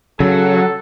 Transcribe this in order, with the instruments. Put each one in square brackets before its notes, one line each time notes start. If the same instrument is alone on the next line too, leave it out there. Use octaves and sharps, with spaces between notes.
[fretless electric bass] C#3 [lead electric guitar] F#3 [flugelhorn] A4